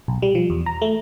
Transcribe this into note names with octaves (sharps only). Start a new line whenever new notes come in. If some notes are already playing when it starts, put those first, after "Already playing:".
B1
G3
F3
E2
A#5
A3